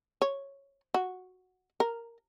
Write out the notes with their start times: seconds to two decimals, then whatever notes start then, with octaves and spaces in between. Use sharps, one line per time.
0.22 C#5
0.94 F#4
1.80 A#4